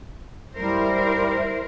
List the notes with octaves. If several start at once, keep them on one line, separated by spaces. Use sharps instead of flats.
G3 E4 A#4 C5